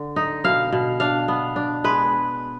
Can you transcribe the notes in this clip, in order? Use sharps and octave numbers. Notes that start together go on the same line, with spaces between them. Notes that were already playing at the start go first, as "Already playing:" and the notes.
Already playing: D3
D#4
B2 F5
B2
D4 F5
B3
D4
G#3 B4